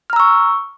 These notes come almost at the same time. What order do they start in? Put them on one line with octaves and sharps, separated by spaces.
F6 A#5 E6 C#6